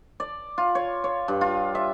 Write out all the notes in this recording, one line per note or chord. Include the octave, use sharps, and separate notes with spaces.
D5
F4
C#5
C#5
G2
F4
E5